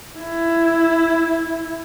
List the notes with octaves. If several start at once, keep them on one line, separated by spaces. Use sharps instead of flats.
E4